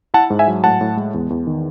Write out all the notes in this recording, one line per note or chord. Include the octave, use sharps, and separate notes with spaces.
E4 F#5 A5
G#2
E5 G#5
F#3
A2 F#5 A5
A2
G#3
E2
E2
D#3